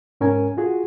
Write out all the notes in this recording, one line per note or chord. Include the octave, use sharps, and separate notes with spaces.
G#2 C#4 A#4 G#5
F4 F#4 G#4